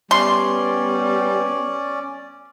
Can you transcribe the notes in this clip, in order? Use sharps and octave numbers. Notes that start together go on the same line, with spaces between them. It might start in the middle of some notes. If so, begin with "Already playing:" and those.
G3 B3 C#4 D5 C6